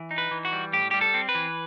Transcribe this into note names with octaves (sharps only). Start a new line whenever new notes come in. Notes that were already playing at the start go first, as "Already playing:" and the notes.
Already playing: E3
D#4
B4
E3
F#4
G3
A2 G4
G3 G4
A4
C4
B4
E3